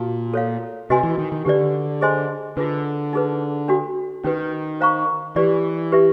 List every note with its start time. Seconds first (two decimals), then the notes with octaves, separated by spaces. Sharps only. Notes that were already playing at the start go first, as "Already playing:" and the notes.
Already playing: A#2 F#4 F5 A5
0.34 A4 C#5 F5
0.90 C3 F#4 B4 D#5 G#5 C6
1.04 E3
1.18 D#3
1.32 D#3
1.45 D3 G4 B4 D5
2.01 G#4 C5 D#5 G#5 C6
2.57 D3 F4 G#4 B4
3.13 D#4 G#4 B4
3.68 D4 F#4 A4
4.24 D#3 C#4 F#4 B4
4.81 C5 F5 A#5 C#6
5.36 E3 G4 B4 D5
5.92 G4 B4 E5